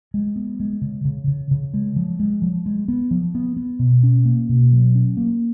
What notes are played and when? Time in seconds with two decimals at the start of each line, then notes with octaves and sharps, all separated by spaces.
0.14 G#3
0.36 B3
0.60 G#3
0.82 C#3
1.05 C#3
1.28 C#3
1.51 C#3
1.74 G#3
1.96 F3
2.20 G#3
2.42 F3
2.66 G#3
2.88 B3
3.11 F3
3.35 B3
3.57 B3
3.79 B2
4.03 C#4
4.25 A#3
4.49 B2
4.72 F#3
4.95 C#4
5.17 A#3